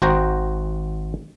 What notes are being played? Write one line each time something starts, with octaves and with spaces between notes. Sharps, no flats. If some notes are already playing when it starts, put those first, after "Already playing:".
G#1 F#4 C5 G5 A#5